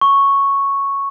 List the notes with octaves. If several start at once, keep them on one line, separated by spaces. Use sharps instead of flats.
C#6